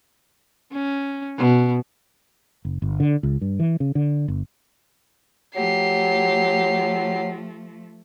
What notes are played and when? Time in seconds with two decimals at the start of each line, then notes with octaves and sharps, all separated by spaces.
0.72 C#4
1.38 B2
2.65 F#1
2.82 G1
3.00 D3
3.23 C#2
3.41 G2
3.60 E3
3.80 C#3
3.95 D3
4.28 G1
5.56 F3 F#3 A3 G4 C7